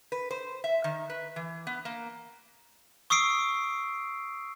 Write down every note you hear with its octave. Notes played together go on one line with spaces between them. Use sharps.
B4
C5
E5
D#3
B4
E3
B3
A#3
C#6 D#6 E6 C7 D7